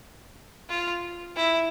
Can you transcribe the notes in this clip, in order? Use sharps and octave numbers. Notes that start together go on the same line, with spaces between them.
F4
E4